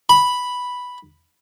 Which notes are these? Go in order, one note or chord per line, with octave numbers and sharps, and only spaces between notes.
B5